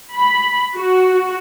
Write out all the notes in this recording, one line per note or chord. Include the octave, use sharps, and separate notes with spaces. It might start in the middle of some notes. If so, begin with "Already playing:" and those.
B5
F#4